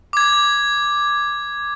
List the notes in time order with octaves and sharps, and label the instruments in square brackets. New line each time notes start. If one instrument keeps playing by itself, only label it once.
[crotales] D6 G#6